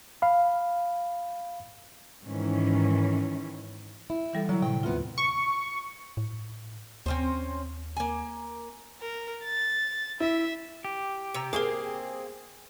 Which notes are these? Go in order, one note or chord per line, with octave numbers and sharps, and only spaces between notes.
F5 B5
G#2 D#3 E3 C#4
E4
E3 G3 A4
D3 F#3 E4
A2 C3 G5
D#2 C3 B3 F4
C#6
A2
D#2 C4 C#4 C5
A#3 G#5
A#4
A6
E4 E5
G4
C3 A#5 E6 C#7
A3 A#3 C4 G#4 A#4 D6